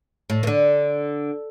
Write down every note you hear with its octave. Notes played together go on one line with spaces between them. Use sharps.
A2
E3
D3